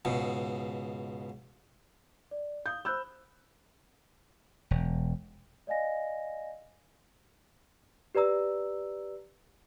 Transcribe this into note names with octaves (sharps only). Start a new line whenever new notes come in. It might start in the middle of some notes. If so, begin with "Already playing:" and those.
C#2 G#2 B2
D5
F5 D#6 G6
C5 B5 E6 F#6 G6
E1
D5 D#5 F5 G#5 A#6
G4 B4 D5 A#5 E6